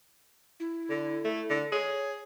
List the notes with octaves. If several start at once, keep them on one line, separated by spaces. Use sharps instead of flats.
E4
D3
A3
D3
G#4 C#5